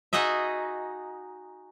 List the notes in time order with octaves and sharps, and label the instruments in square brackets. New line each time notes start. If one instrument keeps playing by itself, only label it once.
[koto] D#4 F#4 G#4 D#5 E5